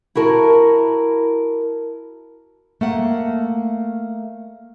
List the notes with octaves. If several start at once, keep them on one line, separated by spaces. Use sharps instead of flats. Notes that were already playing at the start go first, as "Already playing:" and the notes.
E4 F#4 A#4 A5
A3 A#3 F#5